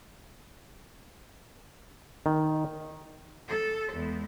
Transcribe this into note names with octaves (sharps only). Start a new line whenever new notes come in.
D#3
A4
E2 G#3